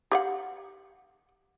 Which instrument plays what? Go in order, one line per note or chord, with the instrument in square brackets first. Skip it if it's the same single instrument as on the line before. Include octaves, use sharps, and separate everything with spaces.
[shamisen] G4 F5 F#5